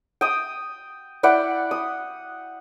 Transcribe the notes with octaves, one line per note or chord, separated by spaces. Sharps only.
G5 D#6
E4 D5 F#5 G5
D#6